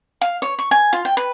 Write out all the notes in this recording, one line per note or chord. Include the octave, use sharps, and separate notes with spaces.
F5
C#5
C#6
G#5
F4
G5
B4